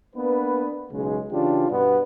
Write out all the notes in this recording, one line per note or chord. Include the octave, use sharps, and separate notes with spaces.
A#3 B3 D4 B4
B1 C#3 G#3
C#3 E3 D4 F4 G4
G2 B2 G3 B3